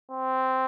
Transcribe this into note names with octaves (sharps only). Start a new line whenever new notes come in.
C4